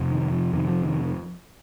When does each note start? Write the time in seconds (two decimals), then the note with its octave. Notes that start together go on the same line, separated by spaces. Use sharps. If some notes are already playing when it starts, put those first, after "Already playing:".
Already playing: F2 C3
0.11 D#3
0.32 F3
0.53 F2 C3 D#3
0.68 F3
0.84 D#3